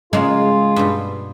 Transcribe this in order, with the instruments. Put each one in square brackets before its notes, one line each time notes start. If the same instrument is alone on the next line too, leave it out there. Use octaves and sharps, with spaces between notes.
[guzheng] C#3 A#3 [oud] G#3 [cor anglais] F4 [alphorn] G#4
[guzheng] G2 B2